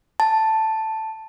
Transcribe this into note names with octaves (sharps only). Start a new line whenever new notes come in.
A5